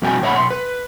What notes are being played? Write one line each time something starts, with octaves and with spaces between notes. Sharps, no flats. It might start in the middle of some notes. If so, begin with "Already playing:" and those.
F2 B2 G3 F#4 G5 G#5
D2 A#2 C#5 E5 F#5 B5
B1 C6
B4